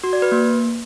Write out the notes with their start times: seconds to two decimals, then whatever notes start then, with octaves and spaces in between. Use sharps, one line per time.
0.04 F#4
0.13 D5
0.22 B4
0.32 A#3